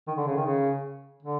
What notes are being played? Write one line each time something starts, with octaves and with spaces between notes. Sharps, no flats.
D#3
D3
C#3
D#3
C#3
D3